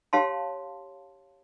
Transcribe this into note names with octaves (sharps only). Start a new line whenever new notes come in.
G4 C#5 F5 A5 C6